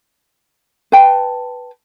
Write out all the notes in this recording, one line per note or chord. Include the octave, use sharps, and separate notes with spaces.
B4 G5 A5